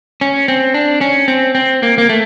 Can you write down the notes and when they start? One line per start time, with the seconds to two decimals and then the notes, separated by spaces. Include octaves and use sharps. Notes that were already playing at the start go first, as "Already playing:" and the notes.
0.21 C#4
0.48 C4
0.74 D4
1.01 C#4
1.28 C4
1.55 C4
1.83 A#3
1.98 A#3
2.09 A3